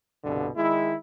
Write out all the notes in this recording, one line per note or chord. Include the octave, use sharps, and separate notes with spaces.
C2 G2 B2 D3
D#3 G#3 E4